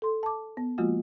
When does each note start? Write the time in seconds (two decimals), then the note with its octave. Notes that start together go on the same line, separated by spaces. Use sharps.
0.02 A4 C6
0.23 A5 D6
0.57 B3
0.78 F3 G#3 A#3 F4 F#4